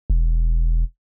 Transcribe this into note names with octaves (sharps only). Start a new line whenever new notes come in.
E1